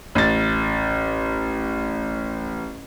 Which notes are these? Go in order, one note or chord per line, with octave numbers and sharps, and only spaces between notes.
A1 A6